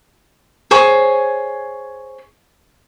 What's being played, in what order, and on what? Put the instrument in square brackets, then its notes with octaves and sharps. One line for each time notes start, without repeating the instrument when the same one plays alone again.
[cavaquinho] G#4 C5 C#5